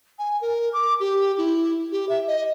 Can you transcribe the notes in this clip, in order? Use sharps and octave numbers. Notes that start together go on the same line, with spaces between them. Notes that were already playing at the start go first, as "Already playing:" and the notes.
G#5
A#4
D6
G4
E4
G4
E5
D#5